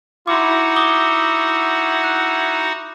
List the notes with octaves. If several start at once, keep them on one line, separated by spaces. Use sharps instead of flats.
D#4 E4 F#4 F#5 C6 D6
D6 D#6 G7
F#6